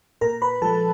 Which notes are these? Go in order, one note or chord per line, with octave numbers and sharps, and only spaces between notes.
A#2 A#4 A#5
B4 B5
F3 G#3 A4 A5